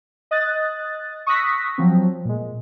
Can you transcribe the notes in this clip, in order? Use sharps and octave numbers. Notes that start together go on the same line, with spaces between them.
D#5 D#6 F#6 A6
C#6 D#6 E6 F#6 A#6 B6
F3 F#3 C4
A#2 G#3